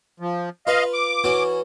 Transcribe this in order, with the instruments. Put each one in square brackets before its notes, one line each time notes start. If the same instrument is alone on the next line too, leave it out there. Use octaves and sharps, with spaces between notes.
[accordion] F3
[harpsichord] F4 B4 [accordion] D#5 F5
[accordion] D6
[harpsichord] E3 C#4 F#4